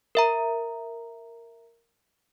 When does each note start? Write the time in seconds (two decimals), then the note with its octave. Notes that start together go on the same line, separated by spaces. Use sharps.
0.15 A#4 E5 A#5